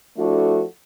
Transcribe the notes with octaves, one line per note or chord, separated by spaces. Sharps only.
F3 A3 D4 E4 F#4 A4